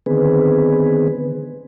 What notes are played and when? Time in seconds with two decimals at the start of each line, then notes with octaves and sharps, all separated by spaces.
0.06 D3 D#3 B3 C4 G#4 B4